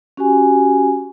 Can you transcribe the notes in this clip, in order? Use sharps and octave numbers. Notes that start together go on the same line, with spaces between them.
C#4 F#4 G4 G#5